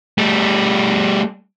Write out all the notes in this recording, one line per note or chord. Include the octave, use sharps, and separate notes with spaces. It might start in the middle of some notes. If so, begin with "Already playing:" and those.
G3 A3